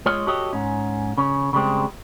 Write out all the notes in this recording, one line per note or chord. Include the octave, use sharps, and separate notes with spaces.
G#3 F4 C#5 D#5
F#4 G4 A4 C#5 D#5
G#2 C#4
C#3 C#4
C#3 G3 G#3 C4